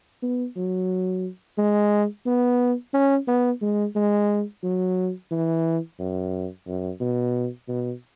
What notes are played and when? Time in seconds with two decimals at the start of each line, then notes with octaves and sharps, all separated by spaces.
0.22 B3
0.56 F#3
1.58 G#3
2.26 B3
2.94 C#4
3.27 B3
3.62 G#3
3.95 G#3
4.63 F#3
5.31 E3
5.99 F#2
6.67 F#2
7.00 B2
7.68 B2